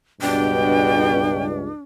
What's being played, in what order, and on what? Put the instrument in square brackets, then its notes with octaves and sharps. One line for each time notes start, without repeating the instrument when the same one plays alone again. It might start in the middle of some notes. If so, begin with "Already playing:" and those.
[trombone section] C#2 G2 [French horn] B2 [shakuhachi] D4 [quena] G5